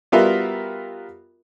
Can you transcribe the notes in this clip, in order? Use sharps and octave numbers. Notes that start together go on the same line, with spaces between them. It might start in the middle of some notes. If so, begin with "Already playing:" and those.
G3 B3 F4 F#4 A#4 E5